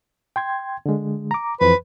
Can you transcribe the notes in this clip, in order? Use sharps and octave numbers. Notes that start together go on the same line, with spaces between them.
G5 C6 G#6
D3 G#3
A#5 D6
F2 E3 B4 C5